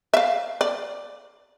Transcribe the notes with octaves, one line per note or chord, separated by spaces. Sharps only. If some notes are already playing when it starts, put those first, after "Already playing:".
E5 F5
D5